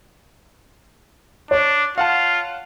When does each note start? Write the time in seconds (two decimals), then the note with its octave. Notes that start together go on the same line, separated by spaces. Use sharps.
1.51 D4 C#5
1.98 F4 F5 F#5 A5